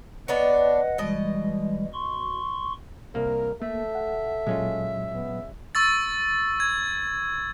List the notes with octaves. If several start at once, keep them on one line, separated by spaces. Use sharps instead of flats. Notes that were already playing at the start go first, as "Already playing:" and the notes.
B3 D4 B4 C#5 D#5 F#5
B2 E3 G3 G#3 D#5
C6 C#6
C2 A#3 A#4
A3 A#3 A4 E5
F#5
A#2 F#3 G#3 C#4 F4
B3
C#6 E6 A6
G#6